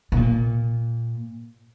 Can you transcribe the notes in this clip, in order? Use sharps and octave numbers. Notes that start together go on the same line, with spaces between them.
B2
A#2